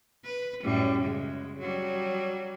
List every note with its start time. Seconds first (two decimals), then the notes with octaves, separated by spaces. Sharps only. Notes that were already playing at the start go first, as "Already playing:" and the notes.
0.25 B4
0.63 F#2 A2 G3
1.02 C#3 G#3
1.58 F#3 G3